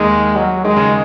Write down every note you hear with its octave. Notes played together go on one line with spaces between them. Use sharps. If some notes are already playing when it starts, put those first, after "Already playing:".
Already playing: D#2 D#3 G#3
F#3
D#3 G#3
C#3